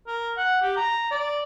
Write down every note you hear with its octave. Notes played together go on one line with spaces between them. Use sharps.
A#4
F#5
G4
A#5
D5